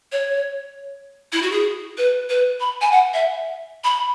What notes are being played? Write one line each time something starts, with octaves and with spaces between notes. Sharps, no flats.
C#5
E4
F#4
G#4
B4
B4
B5
G#5
F#5
E5
B5